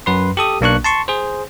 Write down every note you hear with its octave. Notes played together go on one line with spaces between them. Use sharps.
F#2 B4 C6
G4 A4 D#6
B1 A#3 D4 C#6 F#6
A5 C6 C#6
G#4 C5